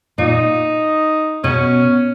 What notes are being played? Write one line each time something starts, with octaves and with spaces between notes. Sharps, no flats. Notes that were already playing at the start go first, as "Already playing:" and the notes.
A#2 D#4
B2 C#4